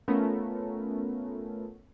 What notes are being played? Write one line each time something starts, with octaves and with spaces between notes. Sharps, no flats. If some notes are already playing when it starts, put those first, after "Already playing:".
A3 B3 C#4 F4 A#4